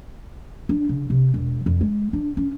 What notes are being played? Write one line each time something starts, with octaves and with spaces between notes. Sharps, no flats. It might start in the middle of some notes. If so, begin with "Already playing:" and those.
D4
C#3
C3
E1
F2
G#3
D4
C#4